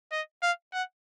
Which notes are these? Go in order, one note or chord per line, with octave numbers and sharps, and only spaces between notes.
D#5
F5
F#5